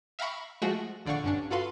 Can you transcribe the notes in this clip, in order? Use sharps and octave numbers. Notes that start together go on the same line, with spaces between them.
E5 F5 G5 A#5 B5 C#6
F3 G#3 A3 F#4 G#4
A#1 D3 D5 F5 F#5 C#6
G2 C#4 D4
F4 F#4 A4 B4 F5 C6